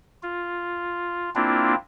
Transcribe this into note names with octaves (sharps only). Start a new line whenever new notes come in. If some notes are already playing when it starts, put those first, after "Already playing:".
F4
A#3 C4 D4 E4 F4